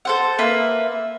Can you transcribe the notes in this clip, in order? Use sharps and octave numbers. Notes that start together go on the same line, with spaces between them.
A4 C5 F#5
A#3 B4 E5